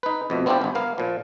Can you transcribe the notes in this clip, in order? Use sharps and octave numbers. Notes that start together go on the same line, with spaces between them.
D#4 B4
F2 B2 A3
B3 C4 D4 E4 F4 G4
G1 G2
A#3 B3 F5
A#2 F3